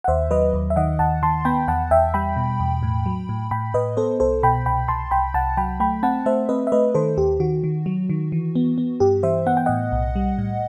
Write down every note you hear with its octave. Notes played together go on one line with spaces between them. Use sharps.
F#5
D#2 C5 E5
F#3 B4 D#5
D#2
E5
D#3 D#5 F#5
D#2 F#5 A5
D#3 A5 C6
B3 G5 B5
E2 F#5 A5
E2 E5 G5
G3 G5 B5
B2
E2
A2
F#3
A2
A2 G5 B5
A2 B4 D#5
B3 A4 C5
C2 A4 C5
B2 G5 B5
C2 G5 B5
C2 A5 C6
C2 G5 B5
C2 F#5 A5
F#3 G5 B5
A3 G5 B5
C4 F#5 A5
A3 C5 E5
C4 B4 D#5
E5
A3 B4 D#5
D#3 A4 C5
D#2 G4
D#3 F#4
D#3
F#3
D#3
E3
B3
B3
G2 G4
E3 C5 E5
B3 F#5
G5
A2 D#5 F#5
B1
G3
A2